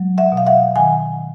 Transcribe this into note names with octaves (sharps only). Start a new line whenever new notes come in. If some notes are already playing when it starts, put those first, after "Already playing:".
Already playing: F#3 G#3
E5 F#5
B2
F5
E5 F#5
D#3 F#5 G#5